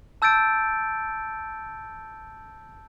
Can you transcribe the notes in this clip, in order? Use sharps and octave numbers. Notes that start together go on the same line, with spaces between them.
A5 E6 G6 A6 D7